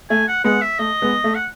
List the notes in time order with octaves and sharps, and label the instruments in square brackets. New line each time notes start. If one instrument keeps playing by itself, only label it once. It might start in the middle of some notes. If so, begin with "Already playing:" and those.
[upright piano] A3 [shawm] G#5
[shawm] F#5
[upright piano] G#3 B3 [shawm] F#5
[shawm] E5
[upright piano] A3 [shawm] D#5
[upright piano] G#3 B3
A3
[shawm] F#5